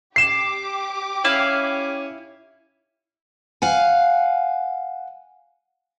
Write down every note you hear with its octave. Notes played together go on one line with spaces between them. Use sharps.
G4 D6 C7 E7
C#4 E4 F5
F5 F#5 G#5